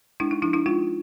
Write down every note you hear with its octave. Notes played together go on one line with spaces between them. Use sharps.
G#3 D4 E4
D#4
F3 D4 E4
D4 E4
G#3 D#4 F4